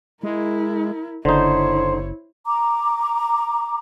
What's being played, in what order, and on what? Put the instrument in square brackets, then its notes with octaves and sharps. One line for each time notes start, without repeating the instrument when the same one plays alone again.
[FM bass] G#3 [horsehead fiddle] E4 A#4
[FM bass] F#1 [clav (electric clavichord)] D3 D#4 [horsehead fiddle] E4 C#5 [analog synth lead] C5
[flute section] A#5 D6